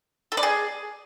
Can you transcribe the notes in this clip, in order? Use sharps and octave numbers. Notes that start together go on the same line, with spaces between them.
A4
D5
G#4